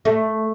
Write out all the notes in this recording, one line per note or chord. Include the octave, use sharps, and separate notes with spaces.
A3